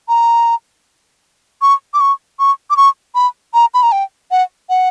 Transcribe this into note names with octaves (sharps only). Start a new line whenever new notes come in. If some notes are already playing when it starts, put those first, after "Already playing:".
A#5
C#6
D6
C#6
C#6
D6
C#6
B5
A#5
B5
A#5
G5
F#5
F#5